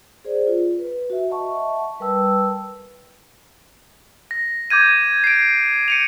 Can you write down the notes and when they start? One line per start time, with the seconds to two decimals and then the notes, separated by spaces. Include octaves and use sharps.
0.25 G#4 C5 D5
0.47 F4
0.79 B4
1.10 F#4 E5
1.30 D#5 E5 F#5 A5 C#6
2.00 G3 A#4 B4 G5 A5 E6
4.31 A#6
4.70 D6 G6 G#6 D#7
5.24 C7 D7
5.88 C#7 D#7 F7